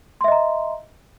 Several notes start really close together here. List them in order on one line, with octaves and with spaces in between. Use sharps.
C6 E5 D#5 A#5